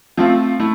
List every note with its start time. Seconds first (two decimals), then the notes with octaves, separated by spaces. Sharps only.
0.18 F3 A3 C4 F4
0.60 A3 E4